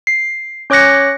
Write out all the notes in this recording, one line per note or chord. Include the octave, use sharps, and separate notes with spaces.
C7
C#4 C#5 D6 F#6 A#6 C#7